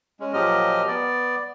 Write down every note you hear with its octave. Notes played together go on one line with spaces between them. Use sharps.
G#3 C#4
A#2 F3 F#3 G4 D#5 F6
B3 D5